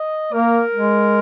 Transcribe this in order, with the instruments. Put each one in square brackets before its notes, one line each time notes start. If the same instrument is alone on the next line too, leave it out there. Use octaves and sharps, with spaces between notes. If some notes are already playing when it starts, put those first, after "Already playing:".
Already playing: [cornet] D#5
[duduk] A#3 [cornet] A#4
[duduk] G#3